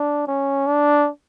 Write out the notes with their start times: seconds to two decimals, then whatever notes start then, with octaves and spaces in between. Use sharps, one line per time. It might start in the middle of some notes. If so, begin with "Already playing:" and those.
Already playing: D4
0.28 C#4
0.67 D4